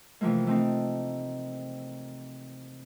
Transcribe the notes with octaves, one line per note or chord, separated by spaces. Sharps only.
C3 E3 F3 A3 A#3
A3 C4 D#4